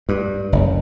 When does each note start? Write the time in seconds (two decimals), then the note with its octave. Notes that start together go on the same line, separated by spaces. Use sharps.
0.09 G2
0.52 F#1